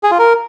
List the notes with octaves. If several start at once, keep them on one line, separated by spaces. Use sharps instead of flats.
G#4
F4
A#4